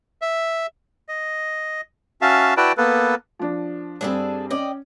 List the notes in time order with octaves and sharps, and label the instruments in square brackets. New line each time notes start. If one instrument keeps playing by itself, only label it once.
[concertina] E5
D#5
C#4 F#4 E5 F5 A5
E4 F#4 B4 D5 G5 A5
A#3 B3 A4 B4
[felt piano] F3 D4
[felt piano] G2 G3 C4 [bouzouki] D4 G#4 A4
[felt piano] C#4 [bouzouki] D5 D#5 G5